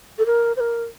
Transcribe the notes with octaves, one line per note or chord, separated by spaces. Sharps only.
A4
A#4
C5
A#4